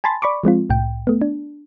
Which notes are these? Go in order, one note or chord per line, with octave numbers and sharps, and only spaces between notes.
G#5 A5 B5 C6 A6
D5 B5 C#6 D6
F3 G#3 C4 F4
C2 A2 G5
A3 B3
D4